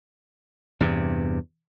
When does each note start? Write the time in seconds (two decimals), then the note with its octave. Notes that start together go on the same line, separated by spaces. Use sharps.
0.80 E2 G2 C3